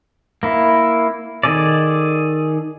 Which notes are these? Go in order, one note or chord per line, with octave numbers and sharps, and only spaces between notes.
A#3 E4
D#3 G#4 A4 D5